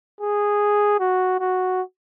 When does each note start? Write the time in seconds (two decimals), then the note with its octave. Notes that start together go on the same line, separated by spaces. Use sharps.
0.21 G#4
1.00 F#4
1.40 F#4